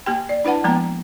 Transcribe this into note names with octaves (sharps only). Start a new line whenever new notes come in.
A#3 G4 G5
D5
D4 E4 B4 F#5 A5
F3 G#3 A#3 B3 G5 A#5